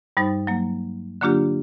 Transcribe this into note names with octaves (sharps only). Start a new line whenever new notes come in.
G2 G3 D#4 C5 A6
F#3 A#3
D3 F#3 A#3 D4 F4 G4